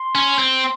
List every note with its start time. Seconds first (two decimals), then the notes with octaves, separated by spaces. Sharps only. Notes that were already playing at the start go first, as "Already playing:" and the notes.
Already playing: C6
0.15 C#4
0.39 C4